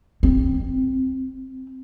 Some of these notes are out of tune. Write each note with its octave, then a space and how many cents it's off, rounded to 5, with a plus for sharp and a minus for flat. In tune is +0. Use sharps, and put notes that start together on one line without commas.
C4 +0